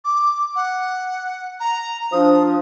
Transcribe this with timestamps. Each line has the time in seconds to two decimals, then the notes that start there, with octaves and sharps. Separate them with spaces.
0.05 D6
0.56 F#5
1.60 A#5
2.12 F3 D4 D#6